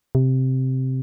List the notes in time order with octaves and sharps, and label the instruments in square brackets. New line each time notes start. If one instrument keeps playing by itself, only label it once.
[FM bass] C3